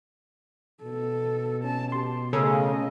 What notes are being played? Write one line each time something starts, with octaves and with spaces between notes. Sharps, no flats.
B2 A4
C#4 A5
G4 C6
C#3 A3 A4 A#4 D#5 E6